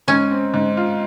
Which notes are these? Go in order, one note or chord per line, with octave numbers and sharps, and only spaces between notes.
G#2 C#4
C4
G#2
F4